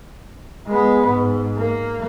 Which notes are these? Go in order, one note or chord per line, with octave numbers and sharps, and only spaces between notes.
G#3 B3
G#2
A#3